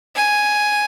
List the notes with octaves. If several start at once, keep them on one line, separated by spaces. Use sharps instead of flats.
G#5